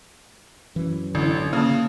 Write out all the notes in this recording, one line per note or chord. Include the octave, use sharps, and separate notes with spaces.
F#2 E3
A1 D3
C#3 A#3 A5